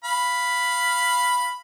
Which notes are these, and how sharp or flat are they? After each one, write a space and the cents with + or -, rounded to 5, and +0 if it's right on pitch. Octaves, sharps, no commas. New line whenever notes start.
F5 +0 B5 +0